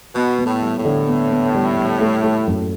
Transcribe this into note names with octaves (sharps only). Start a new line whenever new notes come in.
B2 B3
B3
A2
G3
A2
D3
B3
B3
G3
G3
A3
A3
F#2